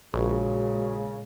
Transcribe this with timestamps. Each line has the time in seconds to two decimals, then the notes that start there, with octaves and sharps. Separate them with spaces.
0.14 A#1 A#2 C#3 G#3 F#4